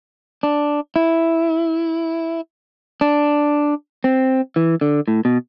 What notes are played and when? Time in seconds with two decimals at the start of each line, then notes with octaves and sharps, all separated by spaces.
0.43 D4
0.96 E4
3.01 D4
4.04 C4
4.56 E3
4.81 D3
5.08 A2
5.25 B2